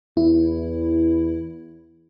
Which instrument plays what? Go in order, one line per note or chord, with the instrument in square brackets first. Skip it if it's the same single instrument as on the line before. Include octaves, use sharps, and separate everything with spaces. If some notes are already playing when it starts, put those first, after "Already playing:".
[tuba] E2 [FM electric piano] E4